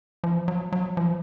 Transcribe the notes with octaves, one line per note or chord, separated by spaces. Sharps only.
F3
F#3
F#3
F3